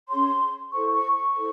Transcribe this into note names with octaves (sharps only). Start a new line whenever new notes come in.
C#4 G#4 C#5 C6
E4 A4 C5 C#6
C#6
C#6
E4 A4 C5